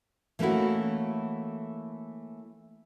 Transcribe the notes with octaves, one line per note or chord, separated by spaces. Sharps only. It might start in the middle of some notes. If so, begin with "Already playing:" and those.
E3 A3 A#3 C#4 E4 F#4